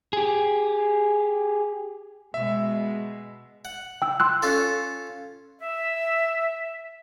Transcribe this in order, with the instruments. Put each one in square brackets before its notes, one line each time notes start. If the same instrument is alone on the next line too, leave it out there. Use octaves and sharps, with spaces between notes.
[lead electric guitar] G4 G#4
[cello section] B2 G#3 [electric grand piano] E5
[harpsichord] F#5
[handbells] G5 E6
C6 E6 F#6
[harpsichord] C#4 F4 A4
[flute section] E5